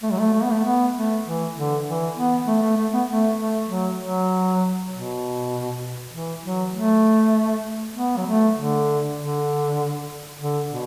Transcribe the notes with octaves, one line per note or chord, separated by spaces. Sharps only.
A3
F#3
A3
A3
B3
A3
B3
A3
E3
D3
E3
B3
A3
A3
A3
B3
A3
A3
F#3
F#3
B2
E3
F#3
A3
B3
F#3
A3
D3
D3
D3
B2